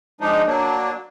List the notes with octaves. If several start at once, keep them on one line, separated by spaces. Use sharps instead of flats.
F3 G#3 D4 D#4
F#3 A#3 D4